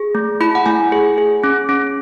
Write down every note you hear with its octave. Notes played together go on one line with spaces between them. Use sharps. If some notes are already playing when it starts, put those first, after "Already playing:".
Already playing: G#4
A3
E4 B5
F#5
A3 G#5
G#4
G#4
C#4
C#4